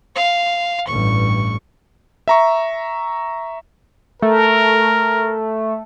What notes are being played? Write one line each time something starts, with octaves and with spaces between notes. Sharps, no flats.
F5
A1 G2 C#6
E5 A#5 C#6
A3 A#4